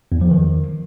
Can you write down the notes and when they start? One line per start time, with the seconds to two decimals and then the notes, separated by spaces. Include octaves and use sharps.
0.12 E2
0.21 F3
0.31 D#3